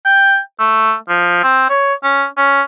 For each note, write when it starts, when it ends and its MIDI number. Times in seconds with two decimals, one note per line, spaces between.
0.06 0.39 79
0.59 0.94 57
1.09 1.40 53
1.44 1.67 60
1.70 1.94 73
2.04 2.25 61
2.37 2.62 61